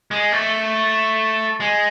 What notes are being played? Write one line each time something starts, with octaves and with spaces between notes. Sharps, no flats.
G#3
A3
G#3